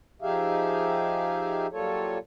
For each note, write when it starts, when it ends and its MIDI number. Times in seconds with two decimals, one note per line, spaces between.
0.22 1.67 53
0.22 1.67 63
0.22 1.67 67
0.22 1.67 68
0.22 1.67 76
0.22 1.67 77
1.72 2.18 54
1.72 2.18 55
1.72 2.18 58
1.72 2.18 65
1.72 2.18 69
1.72 2.18 73